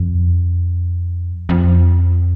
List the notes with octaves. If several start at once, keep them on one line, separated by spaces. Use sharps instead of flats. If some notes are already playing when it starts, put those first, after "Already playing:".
Already playing: F2
F2